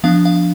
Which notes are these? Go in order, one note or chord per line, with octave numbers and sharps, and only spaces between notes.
F3 B3 D4 F5
F5